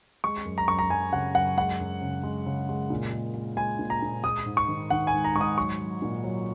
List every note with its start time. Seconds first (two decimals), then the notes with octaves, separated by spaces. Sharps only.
0.24 G#3 C#6
0.45 F#2
0.58 A#5
0.68 F#2 C#6
0.79 A#5
0.90 F#2 G#5
1.12 C#3 F#5
1.34 F#2 F#5
1.57 G#3 F#5
1.80 F#2
2.01 C#3
2.23 G#3
2.46 C#3
2.69 G#3
2.90 A#2
3.12 G#3
3.34 G#3
3.57 G#3 G#5
3.79 A#2
3.90 A#5
4.02 A#2
4.23 G#3 D#6
4.46 G#2
4.57 C#6
4.68 D#3
4.90 D#3 F#5
5.07 G#5
5.13 G#2
5.24 A#5
5.35 G#2 C#6
5.41 D#6
5.58 F#3 C#6
5.80 F#3
6.02 A#2
6.24 F#3